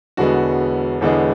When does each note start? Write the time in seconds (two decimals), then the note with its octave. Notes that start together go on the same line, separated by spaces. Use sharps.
0.17 E1 E2 D3 G#3 B3 F#4
1.01 E1 E2 D3 G#3 B3